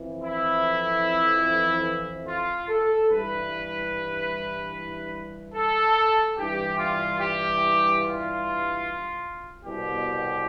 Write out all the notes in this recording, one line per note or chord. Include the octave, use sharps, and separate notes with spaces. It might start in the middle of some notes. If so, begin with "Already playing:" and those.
Already playing: F2 E3
E4
F4
A4
G2 E3 B4
A4
G2 E3 G4
F4
G4
F4
C2 B2 G4